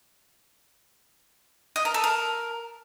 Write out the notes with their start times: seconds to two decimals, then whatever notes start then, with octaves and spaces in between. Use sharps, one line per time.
1.76 D#5
1.85 A#4
1.94 A4
2.04 A#4